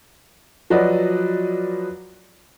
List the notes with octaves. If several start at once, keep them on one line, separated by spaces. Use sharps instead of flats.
F3 F#3 F#4 B4 D5 D#5